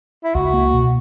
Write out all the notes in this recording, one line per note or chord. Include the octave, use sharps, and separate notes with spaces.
E4
C#2 F#4
A#3
B2